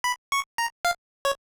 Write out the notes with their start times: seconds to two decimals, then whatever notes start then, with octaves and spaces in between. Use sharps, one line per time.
0.04 B5
0.32 C#6
0.58 A#5
0.85 F5
1.25 C#5